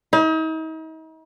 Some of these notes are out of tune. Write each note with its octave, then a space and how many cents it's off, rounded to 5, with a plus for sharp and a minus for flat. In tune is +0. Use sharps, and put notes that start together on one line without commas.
D#4 +40